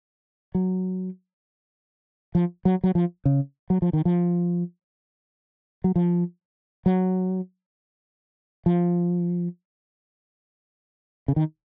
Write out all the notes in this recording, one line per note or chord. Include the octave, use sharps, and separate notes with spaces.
F#3
F3
F#3
F#3
F3
C#3
F#3
F3
D#3
F3
F#3
F3
F#3
F3
C#3
D#3